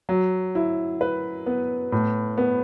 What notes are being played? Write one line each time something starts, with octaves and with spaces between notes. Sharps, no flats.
F#3
E4
B4
B3
A2
B3